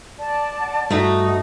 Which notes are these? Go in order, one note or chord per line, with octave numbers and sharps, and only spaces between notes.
D5 A5
F#5
G2 A3 D#4 F#4